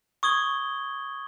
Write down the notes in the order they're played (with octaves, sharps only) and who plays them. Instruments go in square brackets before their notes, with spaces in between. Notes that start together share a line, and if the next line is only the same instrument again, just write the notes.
[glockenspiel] C#6 D#6 G#6 G7